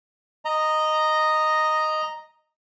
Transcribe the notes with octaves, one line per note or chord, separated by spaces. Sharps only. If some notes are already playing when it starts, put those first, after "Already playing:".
D#5 A#5